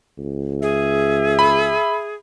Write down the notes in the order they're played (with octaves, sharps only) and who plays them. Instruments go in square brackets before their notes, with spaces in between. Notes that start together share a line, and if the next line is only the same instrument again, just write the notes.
[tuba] C#2
[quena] G#4 [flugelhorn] E5
[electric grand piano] B5